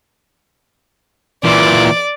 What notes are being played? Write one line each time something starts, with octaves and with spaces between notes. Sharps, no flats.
A#2 E3 D5